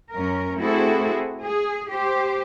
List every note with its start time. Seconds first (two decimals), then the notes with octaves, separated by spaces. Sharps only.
0.12 F#2 C#4 A#4
0.58 A3 C4 E4 F#4 G#4 A4
1.43 G#4
1.90 G4 C5